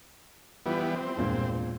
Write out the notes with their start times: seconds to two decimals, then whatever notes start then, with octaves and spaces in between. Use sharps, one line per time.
0.66 E3 F3 G3 B3 F4
0.96 C4
1.16 E1 G2 A#2